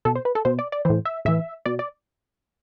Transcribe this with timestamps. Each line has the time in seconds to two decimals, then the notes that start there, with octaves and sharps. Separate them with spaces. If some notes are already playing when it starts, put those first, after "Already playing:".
0.05 B2 A4
0.15 C5
0.25 B4
0.35 A4
0.45 B2 C5
0.59 D5
0.72 D5
0.85 A2 E3 C5
1.05 E5
1.25 A2 E3 E5
1.66 B2 D5
1.79 D5